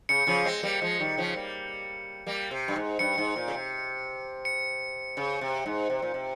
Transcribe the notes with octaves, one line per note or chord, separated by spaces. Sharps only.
C#3 C#7
C#3 F3
G#3 C4
G3 A#3
F3 G#3
D#3 G3
C#3 F3
G3 A#3
G3 A#3
C3
G2
G#2
G2 C#7
G#2
A#2
C#3
C3
C#7
C#3
C3
G#2
C3
A#2
C3